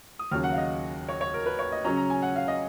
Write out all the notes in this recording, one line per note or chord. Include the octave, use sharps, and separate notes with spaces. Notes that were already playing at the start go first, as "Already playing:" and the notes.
D#6
D#2 C#3 F#3 F6
F#5
F5
D#5
C#5
C#5
A#4
B4
C#5
D#5
C#3 F#3 C#4 A#5
A#5
G#5
F#5
F5
D#5